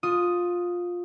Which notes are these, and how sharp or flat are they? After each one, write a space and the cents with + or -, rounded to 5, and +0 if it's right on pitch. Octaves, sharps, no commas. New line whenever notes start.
F4 +15 D#6 +0